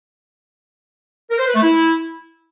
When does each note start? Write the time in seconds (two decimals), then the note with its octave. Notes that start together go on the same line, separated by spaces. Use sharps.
1.31 A#4
1.39 C5
1.47 B4
1.55 A3
1.63 E4